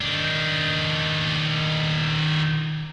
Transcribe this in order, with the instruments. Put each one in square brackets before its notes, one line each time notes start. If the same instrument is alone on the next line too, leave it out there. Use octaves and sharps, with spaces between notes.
[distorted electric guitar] D#3 D4